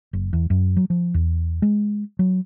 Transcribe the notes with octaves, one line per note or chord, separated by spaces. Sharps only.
F#1
E2
F#2
F#3
F3
E2
G#3
F#3